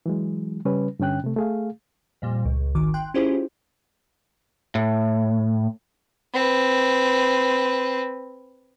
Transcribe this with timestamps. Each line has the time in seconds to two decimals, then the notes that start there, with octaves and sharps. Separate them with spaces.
0.06 E3 F#3 G#3
0.65 C#3 G3 C#4 B4
0.99 G2 D3 C#4 G5 F#6
1.24 C3 A3
1.36 A3 G#4 F5
2.22 F2 A#2 G3
2.45 C#2
2.75 G#1 D#3 D6
2.94 G5 C6 F#6
3.14 C#4 E4 F4 G4 G#4 C5
4.75 A2
6.34 C4 B4